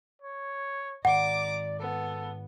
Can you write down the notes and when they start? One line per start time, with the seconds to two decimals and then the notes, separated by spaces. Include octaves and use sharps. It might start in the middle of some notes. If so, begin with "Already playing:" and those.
0.22 C#5
1.05 G#2 D#3 D5 F#5 A#5 D6
1.80 B3 A4